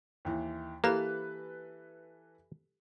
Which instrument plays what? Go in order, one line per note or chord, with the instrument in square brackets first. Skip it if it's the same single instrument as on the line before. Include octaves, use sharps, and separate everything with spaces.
[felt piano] D#2 E3
[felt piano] E3 A4 B4 [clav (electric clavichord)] A#3 [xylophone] G4 A#5